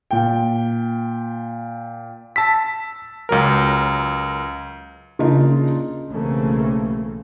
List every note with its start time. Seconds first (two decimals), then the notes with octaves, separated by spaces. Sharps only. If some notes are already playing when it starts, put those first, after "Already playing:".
0.11 A#2 G5
2.36 A5 E6 B6
3.29 C#2 F#3 A#4
5.19 C#3 A#3 D4 D#4 F4
6.09 B1 C#3 E3 A3 A#3 C4